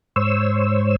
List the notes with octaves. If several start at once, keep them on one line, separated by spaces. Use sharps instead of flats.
G#2 C5 C#5 E6